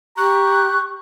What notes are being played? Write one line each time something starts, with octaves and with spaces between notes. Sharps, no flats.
G4 A#5 C#6 F#6